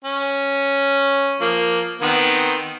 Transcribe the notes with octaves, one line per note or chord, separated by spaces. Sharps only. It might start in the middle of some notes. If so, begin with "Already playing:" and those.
C#4
F3 A#3
D#3 B3 C4